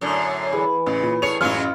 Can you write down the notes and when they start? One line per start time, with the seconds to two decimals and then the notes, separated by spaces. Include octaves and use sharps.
0.01 F#2 A2 D3
0.53 E3 G#4
0.86 A1 C#3
1.03 A#2
1.22 A2 G#4 C#5 C#7 F7
1.41 A1 F#2 F#3 G#3 C#4 F4 F6